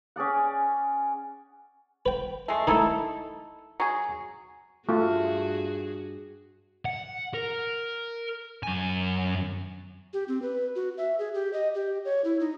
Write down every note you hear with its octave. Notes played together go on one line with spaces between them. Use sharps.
C#4 G#4 D5 F#5
B4 G5
G#3 A3
D#3 A3 D#4 E4 A4
F#3 G#4
G2 A3 F4 F#4 G#4
F#5
A#4
F#2 G#5
G4
C4
B4
F#4
E5
G#4
G4
D#5
G4
C#5
E4
D#4